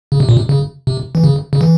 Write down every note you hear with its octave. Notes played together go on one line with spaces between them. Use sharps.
C#3
C3
A#2
C3
C#3
C3
E3
C#3
C#3
E3